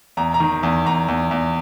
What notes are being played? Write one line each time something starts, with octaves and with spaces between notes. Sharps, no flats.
E2 A#5
A#5
D#3
E2
E2 A#5
E2
E2